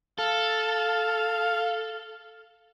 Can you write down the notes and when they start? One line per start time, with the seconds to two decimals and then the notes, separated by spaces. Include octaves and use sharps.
0.19 A4 F5